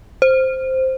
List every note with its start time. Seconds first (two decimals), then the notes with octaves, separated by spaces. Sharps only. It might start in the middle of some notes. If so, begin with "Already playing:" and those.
0.22 C5